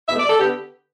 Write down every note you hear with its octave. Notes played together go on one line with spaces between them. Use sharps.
E2 B2 A3 E5
D5
A4
D3 B3 G4